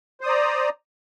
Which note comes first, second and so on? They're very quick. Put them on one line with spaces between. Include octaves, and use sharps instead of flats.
C5 D#6 D5 A#5